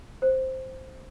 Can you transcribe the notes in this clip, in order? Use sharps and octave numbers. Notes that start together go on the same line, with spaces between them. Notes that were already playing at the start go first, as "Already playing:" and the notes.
C5